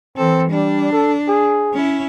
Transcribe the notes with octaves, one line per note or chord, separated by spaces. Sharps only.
E3 C4 A4
G3 D4
A4
G#4
C#4 E4